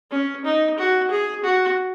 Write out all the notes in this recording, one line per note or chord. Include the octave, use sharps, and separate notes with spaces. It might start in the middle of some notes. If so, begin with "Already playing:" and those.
C#4
D#4
F#4
G#4
F#4